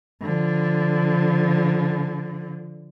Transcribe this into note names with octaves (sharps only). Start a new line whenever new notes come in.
D3 F3